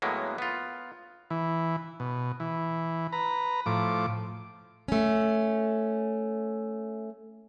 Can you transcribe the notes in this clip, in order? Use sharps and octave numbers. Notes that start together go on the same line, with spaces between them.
A2 F#3 G#3 A#3 B3
B3 F4
E3
B2
E3
B4 A#5
A2 F3 D6
A3 C#4